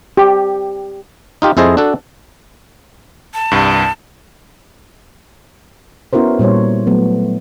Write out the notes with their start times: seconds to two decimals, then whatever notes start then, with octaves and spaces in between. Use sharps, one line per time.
0.17 G4
1.42 D#4 F4 G4
1.57 F2 E4 G#4 C5 D#5 A5
1.77 D4 F#4 A4
3.34 A5
3.51 C2 G2
6.13 B3 C#4 E4 F#4 A#4 C5
6.39 A#2 G3 C5 C#5
6.87 F#3 A3 B3